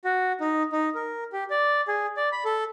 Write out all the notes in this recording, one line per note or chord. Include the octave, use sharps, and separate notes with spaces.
F#4
D#4
D#4
A#4
G4
D5
G#4
D5
B5
A4